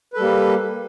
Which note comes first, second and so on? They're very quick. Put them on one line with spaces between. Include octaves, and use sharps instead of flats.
B4 A4 G3 A#3